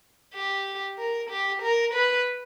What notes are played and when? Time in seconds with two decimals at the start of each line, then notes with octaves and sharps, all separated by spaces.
0.34 G4
0.98 A#4
1.30 G4
1.62 A#4
1.94 B4